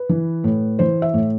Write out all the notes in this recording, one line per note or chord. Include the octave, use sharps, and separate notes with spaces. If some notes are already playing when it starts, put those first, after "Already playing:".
Already playing: B4
E3
A2
E3 C5
E5
A2